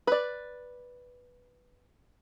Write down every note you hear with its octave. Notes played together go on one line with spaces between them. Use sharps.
B4 D5